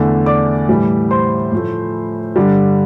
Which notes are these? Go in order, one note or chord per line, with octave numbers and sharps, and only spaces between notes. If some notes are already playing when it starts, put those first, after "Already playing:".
Already playing: E2 D3 A3
D5 D6
A2 E3 G3
C5 C6
A2 F3 A3
G2 D3 G3